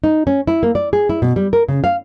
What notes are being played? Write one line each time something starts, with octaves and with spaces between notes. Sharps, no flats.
D#4
C#4
E4
A#3
D5
G#4
E4
B2
G3
A#4
C#3
F5